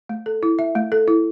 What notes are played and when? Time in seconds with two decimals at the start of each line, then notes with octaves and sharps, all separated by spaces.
0.09 A3
0.26 A4
0.43 E4
0.59 E5
0.75 A3
0.92 A4
1.08 E4